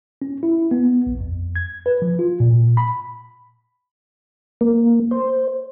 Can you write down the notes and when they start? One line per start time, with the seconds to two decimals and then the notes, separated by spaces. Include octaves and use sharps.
0.22 C#4
0.43 E4
0.71 B3
1.07 A#1
1.20 F2
1.56 G#6
1.86 B4
2.02 F3
2.19 F4
2.40 A#2
2.77 B5
4.61 A#3
5.11 C5